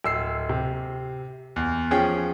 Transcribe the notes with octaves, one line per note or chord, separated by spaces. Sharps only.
D1 E6 C7
C3
E2
F3 C#4 G#4 C#5 G5